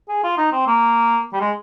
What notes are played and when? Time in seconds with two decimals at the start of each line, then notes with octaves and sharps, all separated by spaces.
0.09 G#4
0.23 F4
0.38 D#4
0.52 C4
0.67 A#3
1.33 G3
1.41 G#3